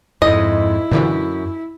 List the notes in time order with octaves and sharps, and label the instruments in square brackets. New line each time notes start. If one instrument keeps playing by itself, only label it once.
[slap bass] F2 G#2 [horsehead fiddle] E4 [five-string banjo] D#5
[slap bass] F#2 [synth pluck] A#2 D3 E3